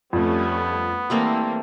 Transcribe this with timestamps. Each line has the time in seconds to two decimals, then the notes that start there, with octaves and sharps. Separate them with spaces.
0.13 F2 G3 A3 B3 C#4
1.10 E3 G3 A3 A#3 C4 C6